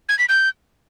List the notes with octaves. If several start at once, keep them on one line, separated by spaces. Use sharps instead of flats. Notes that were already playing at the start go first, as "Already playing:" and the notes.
G#6
B6
G6